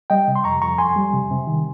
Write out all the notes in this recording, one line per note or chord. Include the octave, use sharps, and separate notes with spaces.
G3 D#5 G5
C3
C6
F2 A#5 C#6
F2 A#5 C#6
F2 G#5 C6
G3
C3
C3
D#3